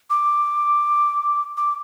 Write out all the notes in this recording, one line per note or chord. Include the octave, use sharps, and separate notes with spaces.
D6
D6